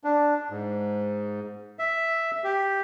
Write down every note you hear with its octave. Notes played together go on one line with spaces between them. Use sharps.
D4
G#2
E5
G4